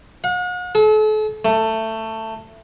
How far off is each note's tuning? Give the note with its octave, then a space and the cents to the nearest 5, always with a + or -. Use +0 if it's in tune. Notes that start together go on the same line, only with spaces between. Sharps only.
F#5 -45
A4 -40
A3 +15